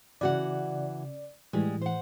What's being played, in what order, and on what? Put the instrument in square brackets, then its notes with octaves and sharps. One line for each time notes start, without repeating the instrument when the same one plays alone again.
[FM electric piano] C#3 D5 [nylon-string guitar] E3 F#4 F#5
[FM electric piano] A2 E3 [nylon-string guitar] G3 G#3
[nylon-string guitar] C5 F#5